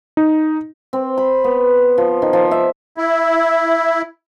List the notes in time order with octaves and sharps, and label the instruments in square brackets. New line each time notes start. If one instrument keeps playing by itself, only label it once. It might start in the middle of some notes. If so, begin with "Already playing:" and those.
[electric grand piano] D#4
[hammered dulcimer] C4
B5
B3
F3
D#3
F3
E5
[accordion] E4